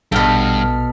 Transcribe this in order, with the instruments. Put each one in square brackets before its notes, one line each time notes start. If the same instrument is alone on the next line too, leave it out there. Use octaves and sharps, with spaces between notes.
[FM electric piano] A#1 F6 [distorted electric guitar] G2 [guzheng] B2 G5 [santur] A4 A5 B5